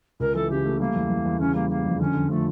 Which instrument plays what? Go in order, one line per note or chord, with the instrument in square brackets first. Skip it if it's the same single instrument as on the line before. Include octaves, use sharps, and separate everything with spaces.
[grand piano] C#2 [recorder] A#4
[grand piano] E3 [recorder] A4
[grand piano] C#3 [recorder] G4
[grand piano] A3
[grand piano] G3 [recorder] A#3
[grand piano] E2
E2
E2
[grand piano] C#3 [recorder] C#4
[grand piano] G3 [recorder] A#3
[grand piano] G3 [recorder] A#3
[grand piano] F2
[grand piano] D3 [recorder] C#4
[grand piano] D3
[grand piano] F3 [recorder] A3